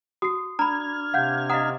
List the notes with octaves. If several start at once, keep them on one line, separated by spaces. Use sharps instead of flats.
F#4 D#6 C7
D4 A#5 B5 F6 G#6
C3 F5 F#5 G6
D#5 F5 F#5 A#5 D#6